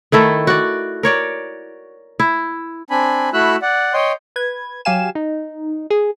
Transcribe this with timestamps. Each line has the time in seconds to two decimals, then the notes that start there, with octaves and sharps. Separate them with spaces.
0.12 D#3 A3 E4 A4
0.47 F#4 D5
1.03 A#4 C#5 D5
2.20 E4
2.90 C4 D4 G#5 B5
3.33 A3 E4 F#4 B5 E6 F#6
3.62 D5 F#5
3.94 C#5 D#5 G5 C6
4.36 B4 G#6
4.85 F#3 G4 F5 G#5 E7
5.15 D#4
5.90 G#4